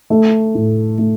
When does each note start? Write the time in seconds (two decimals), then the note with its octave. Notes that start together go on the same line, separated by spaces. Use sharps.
0.10 A3
0.55 A2
0.98 A3